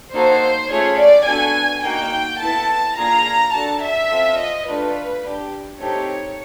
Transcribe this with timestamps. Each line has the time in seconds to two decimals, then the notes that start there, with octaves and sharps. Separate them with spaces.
0.14 A#3 D#4 F#4 A4 C5
0.71 A3 C#4 F4 G#4 C#5
0.98 D5
1.27 B3 D4 F#4 A4 G#5
1.83 A#3 D#4 F#4 G5
2.40 B3 E4 A4 A5
2.97 A#3 D4 F4 G#4 A#5
3.54 D4 F#4 A4 A5
3.82 E5
4.10 C4 F4 A4
4.39 D#5
4.67 A3 D4 F4 B4
5.24 D4 G4
5.81 A3 C4 D#4 G4 C#5